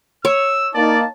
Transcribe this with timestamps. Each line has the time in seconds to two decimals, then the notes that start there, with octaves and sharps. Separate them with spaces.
0.25 C#5 E6
0.74 A#3 D#4 D5 A5